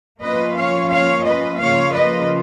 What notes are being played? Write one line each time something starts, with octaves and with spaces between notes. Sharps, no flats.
F3 A#3 C#4 F4 B4 D#5
C#5 F5
C#5 F5
B4 D#5
C#3 F3 A#3 F4 C#5 F5
B4 D#5